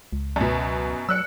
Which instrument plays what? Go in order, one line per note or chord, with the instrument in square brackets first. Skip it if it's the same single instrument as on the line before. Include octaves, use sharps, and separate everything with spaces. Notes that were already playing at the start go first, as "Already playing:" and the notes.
[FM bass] C#2
[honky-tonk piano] F#2 B2
[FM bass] F#3 [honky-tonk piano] E6 F#6 C#7